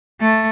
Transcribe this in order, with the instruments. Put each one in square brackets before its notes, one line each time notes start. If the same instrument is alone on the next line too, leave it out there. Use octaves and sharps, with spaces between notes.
[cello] A3